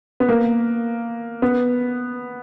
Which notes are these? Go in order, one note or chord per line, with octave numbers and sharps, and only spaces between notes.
B3
A#3
B3